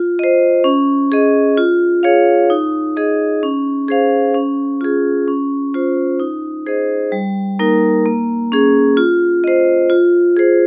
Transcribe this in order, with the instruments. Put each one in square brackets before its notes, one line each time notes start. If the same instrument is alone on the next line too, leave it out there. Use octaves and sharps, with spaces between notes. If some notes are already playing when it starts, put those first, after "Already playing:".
Already playing: [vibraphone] F4
C5 D#5
C#4
G#4 D#5
F4
G#4 C#5 F5
D#4
G#4 D#5
C#4
G#4 C5 F5
C#4
F4 G#4
C#4
F4 C5
D#4
G#4 C5 D#5
G3
A#3 D#4 A#4
A#3
C#4 G#4
F4
C5 D#5
F4
G#4 C5